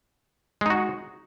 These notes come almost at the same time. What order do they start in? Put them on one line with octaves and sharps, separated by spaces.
G#3 D#4 F#4